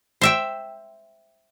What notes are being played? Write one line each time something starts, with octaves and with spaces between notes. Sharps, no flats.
C5 E5 G5